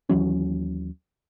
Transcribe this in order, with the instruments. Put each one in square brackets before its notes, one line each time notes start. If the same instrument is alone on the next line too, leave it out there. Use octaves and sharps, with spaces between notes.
[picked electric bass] D#2 E3 F#3 C#4